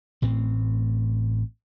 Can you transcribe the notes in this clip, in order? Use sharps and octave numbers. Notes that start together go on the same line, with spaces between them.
A1 A2 C4